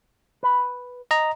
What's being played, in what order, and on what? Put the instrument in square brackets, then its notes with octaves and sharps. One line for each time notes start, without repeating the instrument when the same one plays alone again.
[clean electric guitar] B4
[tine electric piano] D#5 A#5